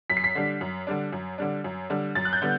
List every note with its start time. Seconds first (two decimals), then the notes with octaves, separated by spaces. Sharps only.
0.10 F#2 B6
0.17 C7
0.24 B6
0.35 D3 G3 D4
0.61 F#2
0.87 D3 G3 D4
1.13 F#2
1.38 D3 G3 D4
1.64 F#2
1.90 D3 G3 D4
2.15 F#2 A6
2.25 F#6
2.33 G6
2.42 D3 G3 B3